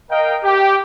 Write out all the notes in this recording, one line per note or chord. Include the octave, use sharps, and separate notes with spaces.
A#4 D#5 F5 G5
G4